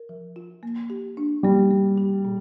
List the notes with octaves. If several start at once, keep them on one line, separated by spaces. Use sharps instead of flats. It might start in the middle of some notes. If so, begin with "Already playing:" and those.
Already playing: A#4
F3
F4
A#3
G4
D4
G3 A#3
A#3
G4
A#2